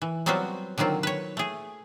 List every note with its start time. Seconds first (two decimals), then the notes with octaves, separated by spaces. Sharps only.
0.02 E3
0.26 F#3 G3 B3 C4 F4 F#4
0.78 D3 D#3 F#3 C4 F4
1.03 B4 C#5
1.37 A3 G#4